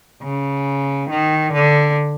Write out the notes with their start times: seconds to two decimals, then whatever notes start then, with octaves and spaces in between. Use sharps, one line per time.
0.22 C#3
1.09 D#3
1.53 D3